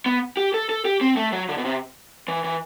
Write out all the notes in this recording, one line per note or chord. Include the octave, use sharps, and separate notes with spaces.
B3
G4
A4
A4
G4
C4
A3
F#3
D3
B2
C3
E3
E3